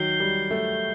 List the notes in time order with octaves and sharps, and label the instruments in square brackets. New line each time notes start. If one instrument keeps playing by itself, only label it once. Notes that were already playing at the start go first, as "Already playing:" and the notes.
Already playing: [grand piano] D#3 F#3 [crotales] G6 C7 G7
[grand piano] G3
A3